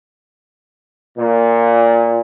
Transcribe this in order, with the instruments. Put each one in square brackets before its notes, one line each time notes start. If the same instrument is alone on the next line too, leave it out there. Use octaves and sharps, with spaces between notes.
[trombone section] A#2